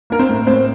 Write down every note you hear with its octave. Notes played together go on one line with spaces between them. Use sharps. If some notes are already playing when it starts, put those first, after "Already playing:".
A#3 A#4
C4 C5
A2
A2 C4 C5